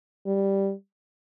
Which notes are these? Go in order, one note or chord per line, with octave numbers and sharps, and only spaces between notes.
G3